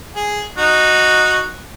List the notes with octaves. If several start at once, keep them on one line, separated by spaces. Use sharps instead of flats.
G#4
D#4 F#4